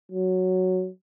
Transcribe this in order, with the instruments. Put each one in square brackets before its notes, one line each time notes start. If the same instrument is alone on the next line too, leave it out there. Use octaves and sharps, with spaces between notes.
[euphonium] F#3